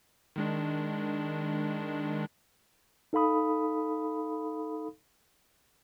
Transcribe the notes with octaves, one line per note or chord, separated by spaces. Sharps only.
D#3 G#3 D4
D#4 A4 F5 B5 D#6